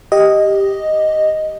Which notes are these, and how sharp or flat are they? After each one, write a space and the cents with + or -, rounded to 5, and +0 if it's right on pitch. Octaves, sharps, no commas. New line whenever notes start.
G4 +0 D#5 +0